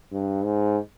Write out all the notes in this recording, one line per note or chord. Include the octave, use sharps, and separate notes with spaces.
G2
G#2